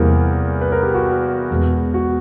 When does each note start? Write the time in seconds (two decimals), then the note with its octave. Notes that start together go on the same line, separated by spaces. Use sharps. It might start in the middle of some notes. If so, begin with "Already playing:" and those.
Already playing: E2 C3 E3 G3 A#3 A#4
0.61 B4
0.72 A#4
0.83 G4
0.94 F#4
1.50 E2 B2 G#3 B3
1.94 F#4